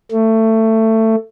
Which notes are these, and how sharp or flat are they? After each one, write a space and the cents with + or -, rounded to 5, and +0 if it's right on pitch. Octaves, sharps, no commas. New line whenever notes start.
A3 +20